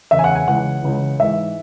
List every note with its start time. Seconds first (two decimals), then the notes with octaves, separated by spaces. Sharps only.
0.11 E2 C#3 E3 E5
0.19 G#5
0.24 F#5
0.35 G#5
0.47 C#2 C#3 E3 F#5
0.83 C#2 C#3 E3
1.20 G#2 E3 E5